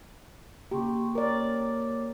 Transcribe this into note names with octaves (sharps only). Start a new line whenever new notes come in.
C#3 A#3 G4 C6 C#6
A#3 A#4 C#5 D5 D6